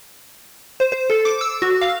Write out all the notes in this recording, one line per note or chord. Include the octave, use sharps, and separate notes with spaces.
C5
C5
A4
D6
E6
F#4
F5